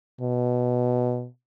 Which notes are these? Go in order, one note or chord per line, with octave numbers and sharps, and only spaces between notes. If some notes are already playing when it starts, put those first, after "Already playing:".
B2